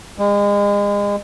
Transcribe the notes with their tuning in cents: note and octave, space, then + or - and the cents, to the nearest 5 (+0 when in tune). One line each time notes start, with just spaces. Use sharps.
G#3 -35